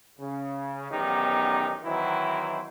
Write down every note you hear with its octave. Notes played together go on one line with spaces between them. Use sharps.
C#3
B1 E2 D#3 C#4 D#4 G4
D#3 E3 F#3 C4 E4